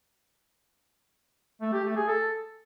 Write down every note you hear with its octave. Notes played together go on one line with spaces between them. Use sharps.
A3
G4
A3
G#4
A4